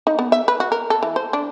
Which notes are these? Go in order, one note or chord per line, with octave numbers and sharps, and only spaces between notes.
D#4
B3
E5
B4
F#4
A#4
A4
E3
C5
D4